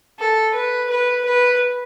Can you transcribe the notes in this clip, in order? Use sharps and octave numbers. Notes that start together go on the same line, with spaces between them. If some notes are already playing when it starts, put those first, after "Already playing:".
A4
B4
B4
B4